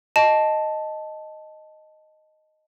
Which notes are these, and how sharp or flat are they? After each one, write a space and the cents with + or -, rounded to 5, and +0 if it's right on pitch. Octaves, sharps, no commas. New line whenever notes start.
D#5 -5 A5 -5